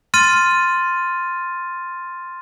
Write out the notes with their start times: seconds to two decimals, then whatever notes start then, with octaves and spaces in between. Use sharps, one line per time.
0.14 C6 F6 A6 D#7